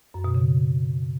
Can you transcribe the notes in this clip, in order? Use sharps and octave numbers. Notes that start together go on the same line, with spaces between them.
F#2
B2
C#3